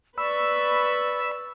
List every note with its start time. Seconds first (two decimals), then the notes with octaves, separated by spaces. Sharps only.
0.18 B4 D5 B5 C#6 E6